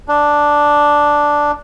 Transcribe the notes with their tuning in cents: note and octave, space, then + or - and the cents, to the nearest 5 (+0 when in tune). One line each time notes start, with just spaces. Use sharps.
D4 +0